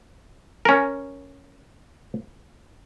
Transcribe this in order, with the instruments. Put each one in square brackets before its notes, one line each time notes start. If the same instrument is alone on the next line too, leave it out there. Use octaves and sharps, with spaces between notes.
[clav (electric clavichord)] C#4 A#4